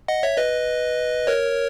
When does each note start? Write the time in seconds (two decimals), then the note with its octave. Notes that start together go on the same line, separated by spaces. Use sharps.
0.08 D#5 F#5
0.23 C#5 E5
0.38 B4 D#5
1.27 A#4 C#5